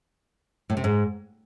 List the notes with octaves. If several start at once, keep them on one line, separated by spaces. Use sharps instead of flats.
A2
C3
G#2